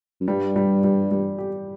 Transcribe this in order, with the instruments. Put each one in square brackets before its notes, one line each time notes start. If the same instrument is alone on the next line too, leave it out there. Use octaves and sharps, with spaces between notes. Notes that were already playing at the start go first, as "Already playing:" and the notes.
[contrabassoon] F#2
[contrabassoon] G2 [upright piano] G3
[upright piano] G3
G3
G3
G4